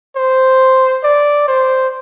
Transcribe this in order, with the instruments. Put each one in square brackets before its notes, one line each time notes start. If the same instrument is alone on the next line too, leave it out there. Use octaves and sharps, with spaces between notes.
[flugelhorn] C5
D5
C5